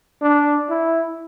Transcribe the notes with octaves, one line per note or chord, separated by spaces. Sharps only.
D4
E4